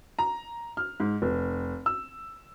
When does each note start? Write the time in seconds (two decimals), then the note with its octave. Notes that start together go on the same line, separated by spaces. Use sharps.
0.19 A#5
0.77 F6
1.00 G#2
1.22 F1
1.86 E6